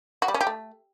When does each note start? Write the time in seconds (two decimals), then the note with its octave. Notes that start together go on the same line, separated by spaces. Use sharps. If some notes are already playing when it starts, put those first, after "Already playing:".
0.22 F#4
0.28 G3
0.34 C#4
0.41 G4
0.47 A3